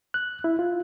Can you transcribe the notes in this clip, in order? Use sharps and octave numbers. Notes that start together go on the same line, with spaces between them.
F#6
E4
F4